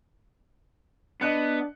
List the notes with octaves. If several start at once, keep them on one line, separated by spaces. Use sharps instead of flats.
B3 D4 D#5 F#6 C#7